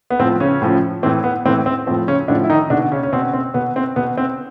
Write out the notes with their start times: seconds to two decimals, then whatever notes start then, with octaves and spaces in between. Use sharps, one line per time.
0.11 B3
0.19 A2 F3 C4
0.40 C#3 C#4
0.62 A2 F3
1.03 A2 E3 C4
1.24 B3
1.45 A2 E3 C4
1.66 C4
1.87 F3 C4
1.90 A2
2.08 C#3 C#4
2.28 A2 D3 F3 D4
2.44 E4
2.49 D#3 D#4
2.70 B2 D3 D4
2.92 C#3 C#4
3.03 C#4
3.13 B2 C4
3.33 C4
3.54 B2 B3
3.76 C4
3.96 B2 B3
4.18 C4